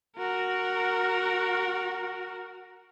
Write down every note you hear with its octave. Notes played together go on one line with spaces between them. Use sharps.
F#4 A#4